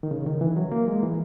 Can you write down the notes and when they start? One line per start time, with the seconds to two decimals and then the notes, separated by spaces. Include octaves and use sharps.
0.03 D#3
0.11 C#3
0.26 D#3
0.41 E3
0.56 F#3
0.72 A#3
0.88 G#3
1.03 E3